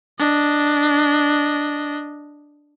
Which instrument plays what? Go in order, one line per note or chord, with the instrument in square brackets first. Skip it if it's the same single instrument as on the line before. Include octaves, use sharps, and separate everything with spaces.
[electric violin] D4 D#5